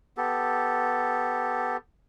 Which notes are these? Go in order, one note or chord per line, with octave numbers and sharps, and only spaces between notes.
B3 G4 A4